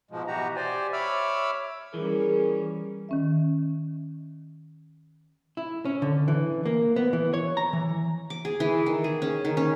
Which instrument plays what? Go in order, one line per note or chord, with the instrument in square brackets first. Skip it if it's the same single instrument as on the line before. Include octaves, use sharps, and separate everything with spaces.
[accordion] G#2 B2 F3 G#3
B2 E3 F#4 G4 A#5
G4 C5 D5 G#5
C#5 E5 B5 D6 E6 F6
[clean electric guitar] E3 [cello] G3 C#4 [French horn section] G#4 A#4
[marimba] D#3 C#4 E5
[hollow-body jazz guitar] E4
C#4
D3
E3
A#3
B3
E3
C#5
A#5
E3
[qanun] D6
G#4
E3
D#3
G#4
C#4
D#3
C#4